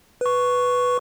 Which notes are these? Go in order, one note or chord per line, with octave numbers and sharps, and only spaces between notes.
B4 C#6